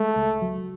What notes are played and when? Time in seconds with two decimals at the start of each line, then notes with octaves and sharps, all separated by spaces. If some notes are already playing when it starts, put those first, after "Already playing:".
Already playing: G#3 A3
0.16 C#2
0.42 F#3